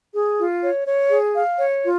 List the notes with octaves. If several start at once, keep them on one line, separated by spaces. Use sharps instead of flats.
G#4
F4
C#5
C#5
G#4
F5
C#5
F4